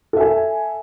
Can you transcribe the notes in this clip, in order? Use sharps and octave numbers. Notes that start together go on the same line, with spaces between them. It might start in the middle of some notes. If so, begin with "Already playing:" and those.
A4 E5 G#5